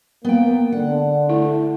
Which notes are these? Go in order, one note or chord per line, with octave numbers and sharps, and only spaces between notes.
A#3 B3 G5
D3 D4 F#5
A3 E4